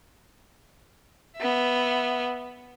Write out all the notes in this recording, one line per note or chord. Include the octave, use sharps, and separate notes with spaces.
B3 E5